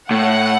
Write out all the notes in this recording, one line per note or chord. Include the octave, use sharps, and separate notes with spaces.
A2 F#5